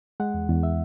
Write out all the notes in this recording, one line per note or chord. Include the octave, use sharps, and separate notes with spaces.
G#3 F#5
E2
E2
E5